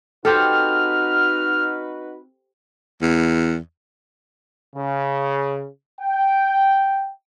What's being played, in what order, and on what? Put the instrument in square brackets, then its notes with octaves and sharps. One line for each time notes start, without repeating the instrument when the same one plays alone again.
[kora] C4 G4 A4 [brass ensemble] D#4 F#4 B4 [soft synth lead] F6
[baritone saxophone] E2
[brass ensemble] C#3
G5